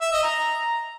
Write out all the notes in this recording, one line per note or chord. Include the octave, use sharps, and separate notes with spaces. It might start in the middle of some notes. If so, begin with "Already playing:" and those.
E5
D#5
A#5